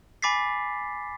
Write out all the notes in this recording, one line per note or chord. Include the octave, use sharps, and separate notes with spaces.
G#5 B5 D6 A6 B6 C7